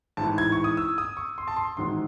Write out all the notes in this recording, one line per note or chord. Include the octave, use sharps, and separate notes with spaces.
A1 G#2 E3 A5
G#6
C#6
D#6
E6
D#6
C#6
C6
A5
C6
A1 G#2 D#3 F#3 C6